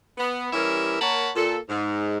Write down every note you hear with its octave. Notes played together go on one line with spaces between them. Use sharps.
B3
E3 G3 C#4 G4 A#4 E5
A#3 A#4 C#5 F#5 A5 B5
A#2 A4
G#2